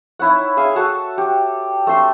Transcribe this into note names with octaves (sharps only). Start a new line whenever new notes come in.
D#4 E4 C#5 F#5
G#4 E5 F5
F#4 A4 F#5 A5
G4
A3 D4 C6 E6